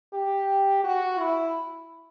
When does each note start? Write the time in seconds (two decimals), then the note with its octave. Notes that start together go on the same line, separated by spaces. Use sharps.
0.14 G4
0.84 F#4
1.20 E4